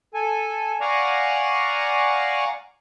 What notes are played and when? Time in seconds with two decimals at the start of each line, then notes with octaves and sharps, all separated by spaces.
0.14 A4 G#5
0.81 D5 F5 F#5 G#5 A#5 C#6